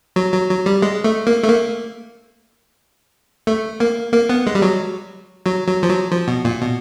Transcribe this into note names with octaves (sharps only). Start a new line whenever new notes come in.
F#3
F#3
F#3
G3
G#3
A3
A#3
A3
A#3
A3
A#3
A#3
B3
G#3
G3
F#3
F#3
F#3
F3
F#3
F3
B2
A#2
B2